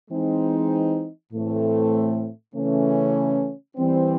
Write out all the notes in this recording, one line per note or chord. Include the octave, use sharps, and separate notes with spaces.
E3 G#3 C4 D#4
A2 E3 A3 C4
C#3 E3 A3 C#4
E3 G3 C4